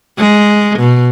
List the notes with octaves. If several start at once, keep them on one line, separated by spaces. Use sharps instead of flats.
G#3
B2